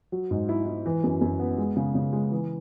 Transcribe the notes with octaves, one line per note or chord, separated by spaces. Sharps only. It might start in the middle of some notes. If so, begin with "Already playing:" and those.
F#3
G#2
E4
E4
E3
F#2
F#2
B3
G#3
C#3
C#3
G#3
E3